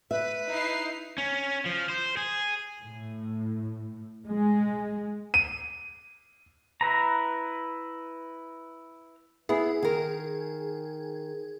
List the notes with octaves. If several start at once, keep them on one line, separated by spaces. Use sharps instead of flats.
B4 E5
D#4 E4 C7
C#4
F3
C5
G#4
A2
G#3
D#7
E4 B4 A#5
B3 E4 G#4
D#3 A#4